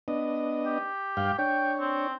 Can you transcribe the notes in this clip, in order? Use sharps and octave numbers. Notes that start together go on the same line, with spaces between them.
B3 D4 D#5
G4
G2 F5 G5
D4 C#5 G5
C4